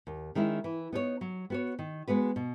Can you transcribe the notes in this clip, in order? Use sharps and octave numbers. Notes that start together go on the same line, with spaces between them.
D#2
D#3 G#3 C#4 E4
E3
B3 D#4 A4 C#5
F#3
B3 F#4 C#5
D#3
G#3 B3 F#4 B4
B2